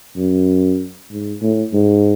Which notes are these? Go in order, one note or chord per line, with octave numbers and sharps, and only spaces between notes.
F#2
G#2
A2
G#2